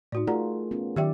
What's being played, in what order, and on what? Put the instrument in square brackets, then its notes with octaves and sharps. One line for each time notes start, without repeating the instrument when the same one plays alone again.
[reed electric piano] A2 [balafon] D#4 F#4 D5
[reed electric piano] A3 G#4 A#4 [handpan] F4 [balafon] D5 F#5 A#5
[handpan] B3 C#4 F4
[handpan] D#3 F#3 D5 [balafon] G4 E5 G5